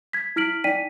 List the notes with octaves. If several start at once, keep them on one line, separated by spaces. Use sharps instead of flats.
G#6 B6
E4 F6 B6 D7 F#7
D#4 D5 G5 B6 D#7